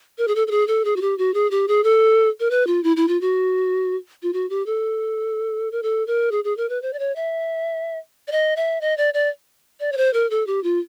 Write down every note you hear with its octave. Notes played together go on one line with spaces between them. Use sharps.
A#4
G#4
A4
A4
G#4
A4
G#4
F#4
G4
F#4
G#4
G4
G#4
A4
A#4
B4
F4
E4
E4
F4
F#4
F4
F#4
G4
A4
A#4
A4
A#4
G#4
G#4
A#4
B4
C5
D5
C#5
E5
D5
D#5
E5
D#5
D5
D5
D5
C#5
C5
A#4
A4
G4
F4